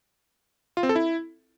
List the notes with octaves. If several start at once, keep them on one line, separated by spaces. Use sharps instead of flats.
F4
C4
A4
E4